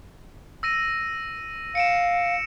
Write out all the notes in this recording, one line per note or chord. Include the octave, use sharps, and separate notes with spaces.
E6 A#6 D#7
F5 C#7 D7 E7